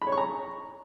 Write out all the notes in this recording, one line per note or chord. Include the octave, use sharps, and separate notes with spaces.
B5
C#5
C#6
A#5